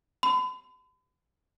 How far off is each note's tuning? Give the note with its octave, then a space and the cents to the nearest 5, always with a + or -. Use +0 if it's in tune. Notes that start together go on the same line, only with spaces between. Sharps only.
B5 +45